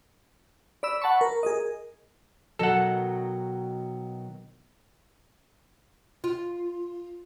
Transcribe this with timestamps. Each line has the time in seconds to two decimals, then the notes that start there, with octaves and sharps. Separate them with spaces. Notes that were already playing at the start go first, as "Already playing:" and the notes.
0.83 D5 B5 E6
1.02 F#5 A5 B5 C#6
1.21 A#4
1.43 G#4 A#4 D#5
2.59 B2 D#3 F#3 A4 F#5
6.24 F4